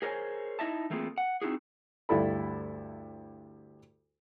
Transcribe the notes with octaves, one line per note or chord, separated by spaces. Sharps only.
G#4 A#4 C5 C#5 G#5
D#4 E4 D#5 E5 A5
E3 A3 A#3 C4 F4 G#4
F#5
C4 D#4 E4 F#4 G#4
D2 G2 E4 A4 B5